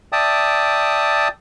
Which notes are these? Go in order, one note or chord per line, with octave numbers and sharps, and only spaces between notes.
D5 E5 G5 A5 D#6